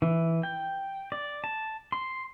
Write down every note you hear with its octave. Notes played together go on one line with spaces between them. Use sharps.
E3
G5
D5
A5
C6